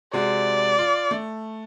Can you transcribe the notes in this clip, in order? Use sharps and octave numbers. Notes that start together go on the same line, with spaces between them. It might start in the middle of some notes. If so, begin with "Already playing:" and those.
C3 G#3 F#4 D5
F4
A3